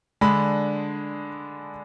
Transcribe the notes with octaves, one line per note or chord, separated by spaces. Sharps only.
D3 G#3 D4 B5